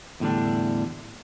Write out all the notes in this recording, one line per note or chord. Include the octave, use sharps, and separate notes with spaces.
E2 A2 D3 G3 D4